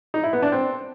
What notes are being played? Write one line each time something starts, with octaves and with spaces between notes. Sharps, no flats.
D#4
E4
B3
D4
C4